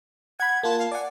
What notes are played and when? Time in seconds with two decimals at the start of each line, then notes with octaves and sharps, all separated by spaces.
0.40 F#5 B5 G#6
0.63 A#3 F4 A5
0.79 F5
0.92 D5 F#5 G#5